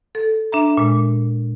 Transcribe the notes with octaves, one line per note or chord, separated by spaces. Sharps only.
A4
D4 E5 A#5
A#2 G#3